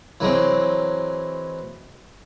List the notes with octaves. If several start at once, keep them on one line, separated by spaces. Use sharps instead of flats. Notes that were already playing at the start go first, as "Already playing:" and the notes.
E3 F#3 G#3 C4